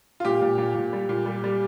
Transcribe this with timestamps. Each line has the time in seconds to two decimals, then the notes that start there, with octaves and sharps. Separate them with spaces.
0.20 F4
0.25 A#2 G4
0.42 A#2
0.58 A#2
0.75 A#2
0.93 G3
1.09 A#2
1.26 G3
1.44 G3